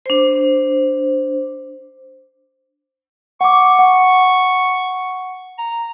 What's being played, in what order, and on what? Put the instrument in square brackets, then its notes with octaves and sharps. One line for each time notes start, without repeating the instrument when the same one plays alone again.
[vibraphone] D4 C5
[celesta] F#5 D6 [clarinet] C#6
[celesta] F#5
[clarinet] A#5